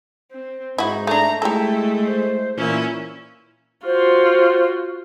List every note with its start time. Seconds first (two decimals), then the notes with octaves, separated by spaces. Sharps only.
0.32 C4
0.78 G#2 D#4 E4 F#4
1.07 A3 D4 A#5
1.42 G#3 A3 E4 G4 A4
2.04 C5
2.57 A#2 E3 C#4 E4
3.85 F4 F#4 C5